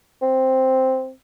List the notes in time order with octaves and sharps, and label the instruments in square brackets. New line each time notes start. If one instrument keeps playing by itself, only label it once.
[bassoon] C4